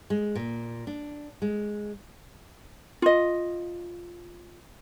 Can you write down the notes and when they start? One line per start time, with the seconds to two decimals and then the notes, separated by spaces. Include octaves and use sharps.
0.10 G#3
0.36 A#2
0.87 D4
1.42 G#3
3.02 F4 D#5